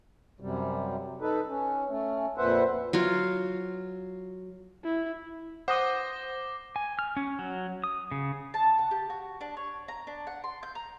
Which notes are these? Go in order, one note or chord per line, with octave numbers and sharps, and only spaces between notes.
F#2 C3 G3
D#4 A4 B4
C#4
A3 C#4
F2 A#2 B4 C5 E5 F#5
F#3 F4
E4
C5 F#5 D6 D#6 A#6 G7
G#5
F6
C#4
F#3
D#6
C#3
A5
F#5
G4
F#4
D4
C#5
A#5
D4
F#5
C6
G6
A#5